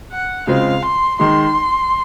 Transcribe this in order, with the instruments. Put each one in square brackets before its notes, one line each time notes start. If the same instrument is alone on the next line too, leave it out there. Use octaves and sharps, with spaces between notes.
[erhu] F#5
[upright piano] C#3 G#3 C4 F4 G#4 [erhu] F5
[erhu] C6
[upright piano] D#3 G#3 D#4 [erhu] C6